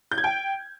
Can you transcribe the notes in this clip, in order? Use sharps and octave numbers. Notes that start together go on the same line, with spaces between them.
G6
G#6
G5